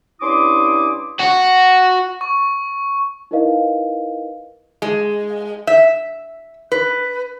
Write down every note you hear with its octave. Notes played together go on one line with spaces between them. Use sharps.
G2 C#4 E4 C6 D6 D#6
F#4
C#6
D#4 E4 A#4 B4 D#5 F5
G#3
E5
B4